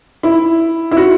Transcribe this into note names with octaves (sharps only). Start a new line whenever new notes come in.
E4
E4
F#4